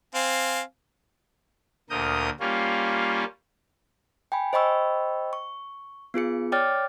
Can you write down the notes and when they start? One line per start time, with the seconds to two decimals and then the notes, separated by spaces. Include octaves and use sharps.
0.15 C4 F5 G#5
1.90 D2 A#2 A#4 D#6 G6
2.40 G3 A#3 C#4 F4
4.32 G5 G#5 B5
4.53 C5 D#5 G5 B5 C#6 E6
5.33 C#6
6.14 B3 F4 G#4 C#7
6.52 C#5 D5 G5 D6 F6 A6